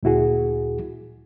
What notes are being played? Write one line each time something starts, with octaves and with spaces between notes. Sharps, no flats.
D2 A#2 E4 F#4 G#4